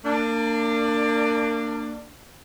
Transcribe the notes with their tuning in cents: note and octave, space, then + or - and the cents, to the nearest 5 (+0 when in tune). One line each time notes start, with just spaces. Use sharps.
A#3 -25 D4 +15